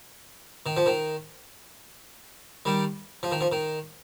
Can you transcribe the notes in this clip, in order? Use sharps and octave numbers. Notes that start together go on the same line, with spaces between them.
D#3
F3
D#3
D#3 G3
F3
D#3
F3
D#3